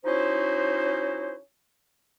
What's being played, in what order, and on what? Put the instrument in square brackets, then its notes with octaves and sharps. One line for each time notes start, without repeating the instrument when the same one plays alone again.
[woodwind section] F3 C#4 D#4 E4 F#4 C5